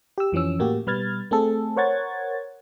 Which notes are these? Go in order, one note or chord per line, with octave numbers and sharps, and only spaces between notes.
G4 E6
F2 E3 F3 C#4 E6
A2 A#3 F#4 G4
B2 G3 B4 F6 G#6 A6
A3 C4 G#4 A4
A#4 C5 C#5 F#5 G#6 A6